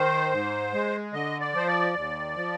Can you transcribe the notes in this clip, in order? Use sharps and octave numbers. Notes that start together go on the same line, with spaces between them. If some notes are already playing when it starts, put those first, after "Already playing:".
Already playing: D#3 C5
G#2
G#3
D3 D#5
D5
F3 C5
D5
D#2
F3